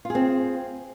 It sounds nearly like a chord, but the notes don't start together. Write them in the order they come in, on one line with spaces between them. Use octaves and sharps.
F4 G#4 C4